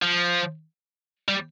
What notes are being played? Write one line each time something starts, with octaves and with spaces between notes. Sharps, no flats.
F3
G3